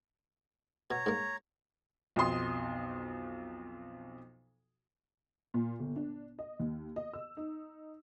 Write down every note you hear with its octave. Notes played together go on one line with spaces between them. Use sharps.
B2 C#5 A#5
G#2 A#3
B1 F2 C6 D#6
A#2
G1
D4
D#5
D#2
D#5
E6
D#4